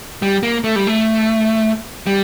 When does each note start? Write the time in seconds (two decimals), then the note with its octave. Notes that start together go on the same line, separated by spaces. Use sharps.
0.22 G3
0.43 A#3
0.64 A3
0.76 G3
0.87 A3
2.07 G3